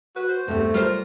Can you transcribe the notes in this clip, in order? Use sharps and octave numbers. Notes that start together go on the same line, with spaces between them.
F#4 B4
C5
E2 G2 C3 A3
G3 F4 A#4 C5